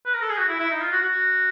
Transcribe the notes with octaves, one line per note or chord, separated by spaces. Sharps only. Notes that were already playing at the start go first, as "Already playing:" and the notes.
B4
A#4
A4
G#4
F#4
E4
E4
D#4
F4
F#4
F#4